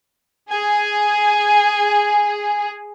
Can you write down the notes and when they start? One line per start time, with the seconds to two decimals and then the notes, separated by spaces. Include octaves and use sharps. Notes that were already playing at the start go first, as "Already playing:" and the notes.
0.51 G#4 G#5